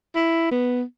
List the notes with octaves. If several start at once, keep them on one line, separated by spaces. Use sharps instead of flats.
E4
B3